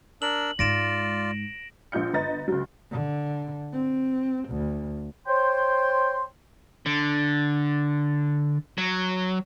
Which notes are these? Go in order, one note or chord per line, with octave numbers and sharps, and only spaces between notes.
D4 A#4 E6 F#7
G#2 G#3 F4 D5 A#6 D7 E7
A#1 F4 G6 C#7
G1 B4 D#5 A#5 A6
C#2 F#3
D3
C4
D2
C5 C#5 G5 C6
D3
F#3